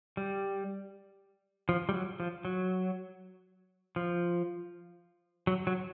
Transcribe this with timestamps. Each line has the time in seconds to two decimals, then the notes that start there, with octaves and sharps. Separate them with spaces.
0.17 G3
1.69 F3
1.89 G3
1.94 F#3
2.20 F3
2.45 F#3
3.96 F3
5.47 F#3
5.67 F#3